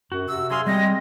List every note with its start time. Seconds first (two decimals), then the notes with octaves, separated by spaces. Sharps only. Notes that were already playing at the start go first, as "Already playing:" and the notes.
0.12 F#2 F#4
0.28 C3 E6
0.50 F#3 G#4 F5 C6
0.67 G3 G#3 C4 D#5